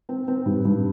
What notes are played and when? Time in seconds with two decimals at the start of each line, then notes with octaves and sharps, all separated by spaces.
0.09 C4
0.28 C4
0.46 G2
0.65 G2